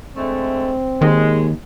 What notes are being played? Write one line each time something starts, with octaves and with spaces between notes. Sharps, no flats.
D3 G#3 A3 C4
D#2 D#3 G#3